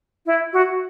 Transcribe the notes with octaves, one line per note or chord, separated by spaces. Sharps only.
E4
F#4